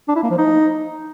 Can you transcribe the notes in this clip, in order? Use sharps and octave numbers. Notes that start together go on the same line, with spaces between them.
D4
E4
A#3
F3
D#4